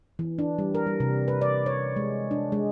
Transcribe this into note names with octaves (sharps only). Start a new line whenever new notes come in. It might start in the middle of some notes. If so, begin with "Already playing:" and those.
E3
D4
G3
A#4
G3
C3
B4
D5
C#5
G#3
D4
G#3